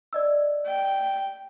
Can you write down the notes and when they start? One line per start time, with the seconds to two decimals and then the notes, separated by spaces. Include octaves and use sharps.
0.13 D5 D#5 E6
0.67 G5